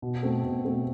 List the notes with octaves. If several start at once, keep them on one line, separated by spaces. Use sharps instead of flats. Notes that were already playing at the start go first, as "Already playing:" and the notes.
B2
A3 C4
B2
A3 C4